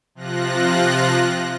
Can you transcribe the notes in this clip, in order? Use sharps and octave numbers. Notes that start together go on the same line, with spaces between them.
C3 F3 F4 F#6 A#6